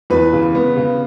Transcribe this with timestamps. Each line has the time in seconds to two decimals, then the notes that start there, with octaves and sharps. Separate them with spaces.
0.10 E2 B4
0.33 C#3
0.55 B3
0.77 C#3